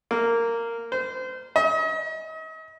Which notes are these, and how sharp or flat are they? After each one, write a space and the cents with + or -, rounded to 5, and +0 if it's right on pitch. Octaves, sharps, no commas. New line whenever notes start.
A#3 -10
C5 -30
D#5 +40